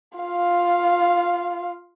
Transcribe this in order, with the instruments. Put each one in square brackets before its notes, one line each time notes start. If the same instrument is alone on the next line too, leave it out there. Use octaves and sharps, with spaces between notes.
[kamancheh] F4 F5